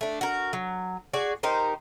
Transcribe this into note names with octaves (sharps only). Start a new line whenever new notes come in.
A3 D4
F#4 A#4
F#3
F#4 G#4 D5
D#4 G4 A#4 C5